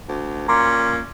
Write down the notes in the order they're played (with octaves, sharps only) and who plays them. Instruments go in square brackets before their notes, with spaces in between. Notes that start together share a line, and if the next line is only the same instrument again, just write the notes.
[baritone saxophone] D2
[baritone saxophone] A#2 [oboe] C#4 [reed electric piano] A#5 C6 D6